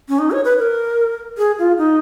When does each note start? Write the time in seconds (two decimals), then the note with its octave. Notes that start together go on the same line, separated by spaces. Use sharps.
0.09 C#4
0.19 D#4
0.32 C#5
0.45 B4
0.59 A#4
1.38 G#4
1.59 F4
1.78 D#4